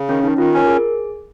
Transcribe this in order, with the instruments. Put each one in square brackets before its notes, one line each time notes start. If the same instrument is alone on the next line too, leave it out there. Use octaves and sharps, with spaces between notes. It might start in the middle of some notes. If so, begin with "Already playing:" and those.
Already playing: [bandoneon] C#3
[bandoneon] D#3 [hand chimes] C#4
[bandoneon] D#3 [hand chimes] D#4
[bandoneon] D#3 [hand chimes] F4
[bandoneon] C#4 [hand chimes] A#4
[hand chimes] G#4